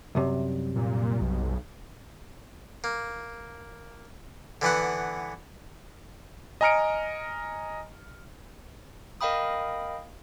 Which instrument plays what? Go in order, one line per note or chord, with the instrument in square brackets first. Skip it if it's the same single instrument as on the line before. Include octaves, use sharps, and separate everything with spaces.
[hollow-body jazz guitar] C2 F#2 C3
[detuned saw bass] A#2
B1
[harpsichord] A#3
D3 E3 B3 F#5
[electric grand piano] D#5 G#5 A#5 F6 C#7 D7
[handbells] A#4 D#5 F5 G5 B5 D#6